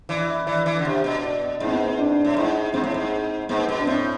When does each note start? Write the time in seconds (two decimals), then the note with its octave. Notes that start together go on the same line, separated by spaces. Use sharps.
0.09 E3 D5
0.28 E5
0.47 E3 D5
0.66 E3
0.79 D3
0.85 C3
1.04 B2
1.23 D5
1.60 G#2 E4
1.67 C4
1.72 B3
1.85 C4
1.98 D4
2.25 A2
2.37 G#2 E4
2.74 G#2 C4
2.84 A2
2.94 G#2
3.49 G#2 B3
3.69 B2
3.79 D4
3.87 A2 C4